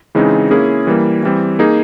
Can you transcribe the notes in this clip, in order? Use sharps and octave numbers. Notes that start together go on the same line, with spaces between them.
C#3 E3 G#3 C4 D#4
A#3 C#4 E4 G#4
E3 G3 A#3
E3 G3 C4
A#3 D#4 G#4